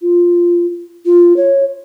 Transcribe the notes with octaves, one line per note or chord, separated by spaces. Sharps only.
F4
F4
C#5